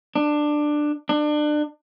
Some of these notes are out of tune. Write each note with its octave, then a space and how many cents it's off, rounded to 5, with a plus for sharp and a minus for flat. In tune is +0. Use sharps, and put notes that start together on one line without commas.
D4 +15
D4 +30